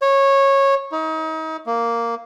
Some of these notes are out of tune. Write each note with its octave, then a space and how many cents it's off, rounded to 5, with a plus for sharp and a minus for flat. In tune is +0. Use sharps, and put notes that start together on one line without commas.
C#5 -15
D#4 +35
A#3 -5